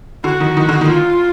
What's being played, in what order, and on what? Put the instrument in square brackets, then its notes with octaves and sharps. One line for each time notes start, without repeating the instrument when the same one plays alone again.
[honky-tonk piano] D3 [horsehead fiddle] F#4
[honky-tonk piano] D#3
D#3
D3
D#3
[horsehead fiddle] F4